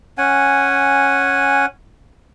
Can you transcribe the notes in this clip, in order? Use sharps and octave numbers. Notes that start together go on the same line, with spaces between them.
C#4 F#5 G#5